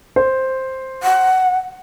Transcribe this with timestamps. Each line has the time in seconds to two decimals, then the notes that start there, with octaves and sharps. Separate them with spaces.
0.16 C5
1.03 F#5